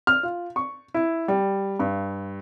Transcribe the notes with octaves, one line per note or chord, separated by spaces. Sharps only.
F6
F4
C#6
E4
G3
G2